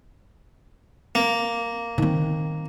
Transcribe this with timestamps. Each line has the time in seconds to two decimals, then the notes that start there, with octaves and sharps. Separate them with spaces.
1.15 A#3
1.98 D#3 C4